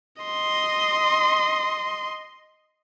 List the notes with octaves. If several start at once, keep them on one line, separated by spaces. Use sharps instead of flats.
D#5 C6